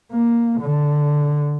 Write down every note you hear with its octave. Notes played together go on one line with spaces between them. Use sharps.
A#3
D3